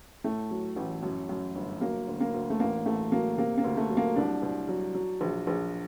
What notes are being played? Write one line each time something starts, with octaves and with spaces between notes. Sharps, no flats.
A2 A3
F#3
A1
F#2
F#2
G1
F#3 A#3
D2
A#3
D2
A3
A1 A#3
A1 A3
F#3 A#3
C3 A#3
A#3
D2
A3
F#3
A#3
C2 D4
C2
F#3
F#3
A#1
A#1